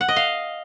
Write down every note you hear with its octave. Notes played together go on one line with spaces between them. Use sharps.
F#5
D#5
F5